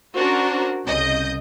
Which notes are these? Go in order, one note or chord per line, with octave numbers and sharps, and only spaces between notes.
C#4 D4 F#4 A#4 C5
C2 C#3 D#5 G6